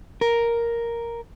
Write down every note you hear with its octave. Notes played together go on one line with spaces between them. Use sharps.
A#4